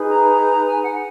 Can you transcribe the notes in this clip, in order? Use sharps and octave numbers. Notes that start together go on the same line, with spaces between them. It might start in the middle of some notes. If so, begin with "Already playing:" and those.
Already playing: D#4 G#4 B4
A#5
G#5
F#5